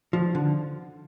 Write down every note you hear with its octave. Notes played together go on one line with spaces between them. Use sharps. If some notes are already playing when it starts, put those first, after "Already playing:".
F3
D3